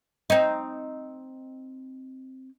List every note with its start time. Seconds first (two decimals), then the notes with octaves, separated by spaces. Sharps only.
0.30 C4 D#4